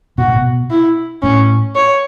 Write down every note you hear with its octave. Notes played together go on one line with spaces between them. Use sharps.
B2 F#4
A2
B2
E4
A2 C#4
C#5